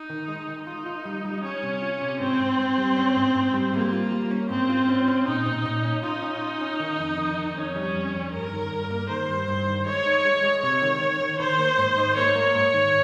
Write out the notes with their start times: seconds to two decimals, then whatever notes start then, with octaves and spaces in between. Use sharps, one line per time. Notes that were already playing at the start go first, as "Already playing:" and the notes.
Already playing: D#4
0.10 D#3
0.28 G#3
0.49 D#3
0.67 D#4 F4
0.86 F4
1.05 G3
1.25 G3
1.43 G3 C#4
1.63 C3
1.82 F4
2.01 C3
2.20 G#2 C4
2.40 G#2
2.59 G#2
2.78 G3
2.97 C#4
3.16 G#2
3.35 G#2
3.54 G3
3.73 G3 A#3
3.93 F4
4.12 G3
4.31 C#4
4.50 G#2 C4
4.69 F4
4.89 C#4
5.08 C#4
5.27 A#2 D#4
5.46 A#2
5.65 A#2
5.84 C#4
6.03 D#4 F4
6.22 C#4
6.41 F4
6.61 C#4
6.80 D#3
6.99 F2
7.18 D#3
7.38 D#3
7.56 F2 C#4
7.76 G3
7.95 F2
8.14 F2
8.33 G2 A#4
8.52 D#3
8.72 G2
8.91 A#3
9.10 D#3 C5
9.29 G2
9.48 G2
9.67 D#3
9.87 G#3 C#5
10.06 D#4
10.25 G#3
10.44 G#3
10.63 C3 C#5
10.82 D#3
11.01 D#3
11.21 D#3
11.40 D#3 C5
11.59 A#3
11.78 G#2
11.98 D#4
12.17 A#3 C#5
12.36 A#3
12.55 G#2
12.74 D#3